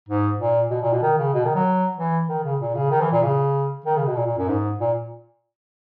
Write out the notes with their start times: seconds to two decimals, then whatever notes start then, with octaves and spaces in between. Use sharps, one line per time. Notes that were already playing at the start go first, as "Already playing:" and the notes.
0.09 G#2
0.39 A#2
0.70 B2
0.82 A#2
0.93 B2
1.02 D#3
1.18 C#3
1.34 B2
1.45 D#3
1.55 F#3
1.96 E3
2.29 D#3
2.44 C#3
2.60 A#2
2.75 C#3
2.91 D#3
3.01 E3
3.12 A#2
3.23 C#3
3.86 D#3
3.96 C#3
4.06 B2
4.16 A#2
4.27 A#2
4.38 F#2
4.48 G#2
4.80 A#2